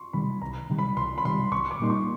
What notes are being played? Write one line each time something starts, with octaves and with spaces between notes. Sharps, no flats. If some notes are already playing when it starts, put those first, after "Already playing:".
Already playing: C6 C#6
C3 D#3 G3 B5
C2 A#5
C3 D#3 G3
B5
C2 C6
B5
C3 D#3 G3 C6
C2 C#6
D6
A#2 G3 A#3 D#4 C6
C#6